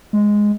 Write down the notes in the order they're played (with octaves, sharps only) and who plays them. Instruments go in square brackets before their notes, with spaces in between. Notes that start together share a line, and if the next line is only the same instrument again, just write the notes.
[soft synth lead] G#3